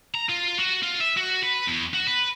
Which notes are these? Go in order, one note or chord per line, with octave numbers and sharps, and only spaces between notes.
A#5
F4
F#4
F4
E5
F#4
B4
E2
F#4
B4